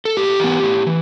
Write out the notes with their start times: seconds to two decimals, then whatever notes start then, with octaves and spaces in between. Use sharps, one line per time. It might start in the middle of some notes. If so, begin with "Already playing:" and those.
0.05 A4
0.17 A2 G4
0.40 E3 B3
0.63 A2
0.87 E3